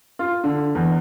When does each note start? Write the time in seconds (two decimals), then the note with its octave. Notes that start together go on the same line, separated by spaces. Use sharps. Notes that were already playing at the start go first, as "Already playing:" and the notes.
0.19 F4
0.44 D3
0.75 E2